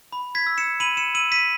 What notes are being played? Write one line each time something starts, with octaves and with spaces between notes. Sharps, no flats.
B5
G#6 B6
E6
C#7 E7
B5 D#7 F#7
C#7 E7
E6 D#7 F#7
B6 D#7